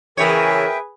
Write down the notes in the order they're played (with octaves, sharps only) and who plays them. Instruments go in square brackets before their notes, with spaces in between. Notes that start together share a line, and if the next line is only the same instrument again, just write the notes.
[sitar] C#3 E3 C#5 [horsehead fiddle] G#4 B4 [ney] A#4 [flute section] E5 G5